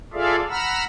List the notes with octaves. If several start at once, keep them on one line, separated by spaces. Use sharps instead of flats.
F4 G#4 A4 D5 E5 F5
F#5 A#5 B5 E6 F6